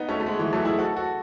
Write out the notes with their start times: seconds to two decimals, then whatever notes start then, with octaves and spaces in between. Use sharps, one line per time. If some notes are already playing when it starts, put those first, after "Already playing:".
Already playing: B3 D#4
0.09 A3 C#4
0.20 A3
0.26 G#3 B3
0.39 E3 G#3
0.53 F#3 A3
0.65 E4 G#4
0.78 F#4 A4
0.96 F#4 A4